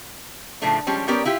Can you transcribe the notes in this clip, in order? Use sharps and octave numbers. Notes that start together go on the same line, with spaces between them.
A2 C#3 F3 A3 D4
F3 G3 G#3 C#4
G3 B3 C#4 G4 A#4 D5
E4 F4 G4